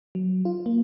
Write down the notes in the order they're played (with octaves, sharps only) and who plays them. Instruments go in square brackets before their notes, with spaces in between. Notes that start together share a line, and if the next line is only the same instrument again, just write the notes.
[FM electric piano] F#3
F4
A#3